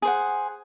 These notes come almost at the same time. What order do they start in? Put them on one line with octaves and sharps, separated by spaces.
G#4 C5 F#5